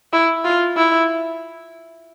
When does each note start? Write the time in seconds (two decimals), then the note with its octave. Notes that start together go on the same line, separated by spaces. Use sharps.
0.13 E4
0.44 F4
0.76 E4